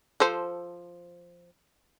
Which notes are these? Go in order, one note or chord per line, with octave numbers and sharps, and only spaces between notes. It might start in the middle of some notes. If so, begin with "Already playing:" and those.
F3 A4 C5